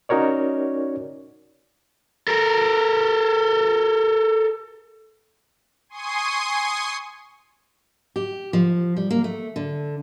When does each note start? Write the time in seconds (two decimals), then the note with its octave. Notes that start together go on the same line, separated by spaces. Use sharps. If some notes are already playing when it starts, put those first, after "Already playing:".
0.09 C#4 D#4 F#4 A#4 C#5 D5
2.28 A4 A#4
5.89 G#5 C6 C#6 D#6 C7 D#7
8.16 G4
8.53 F3
8.97 G3
9.11 A#3
9.24 A3
9.56 D3